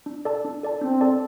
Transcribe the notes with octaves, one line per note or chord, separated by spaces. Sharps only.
D4
A4 D5 A5
D4
A4 D5 A5
C4 D4
A4 D5 A5